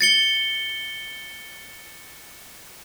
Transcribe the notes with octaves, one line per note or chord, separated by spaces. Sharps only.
A6 C#7 G7